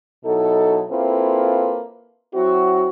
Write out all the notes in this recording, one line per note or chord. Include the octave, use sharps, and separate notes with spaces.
B2 F#3 D#4 E4 A4
A#3 C4 E4 F4 A4 B4
F#3 C4 E4 F#4